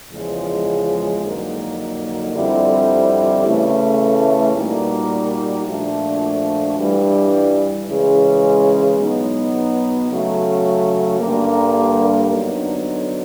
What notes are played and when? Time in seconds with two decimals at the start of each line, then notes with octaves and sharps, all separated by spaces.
0.12 E2 C#3 F3 G#3
1.23 F2 D3 F#3 A#3 D#4
2.34 F2 D3 G3 C4 E4
3.45 C#3 E3 A3
4.55 A#2 G3 A#3 D#4 F#4
5.66 A#2 F3 A3 D4 F#4
6.77 G2 E3 G3
7.88 C#3 E3 G#3
8.99 B2 F#3 B3 D#4
10.10 C#3 F#3 A3
11.20 G2 D3 G3 A#3
12.31 D3 F#3 B3 D#4